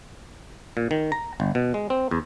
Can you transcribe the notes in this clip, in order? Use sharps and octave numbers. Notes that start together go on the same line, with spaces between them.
A#2
D#3
A#5
G1
B2
G#3
C4
E2